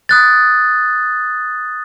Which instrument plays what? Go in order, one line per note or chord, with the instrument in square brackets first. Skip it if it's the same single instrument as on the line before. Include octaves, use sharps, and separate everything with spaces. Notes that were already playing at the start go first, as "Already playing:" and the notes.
[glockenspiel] D#6 F#6 A6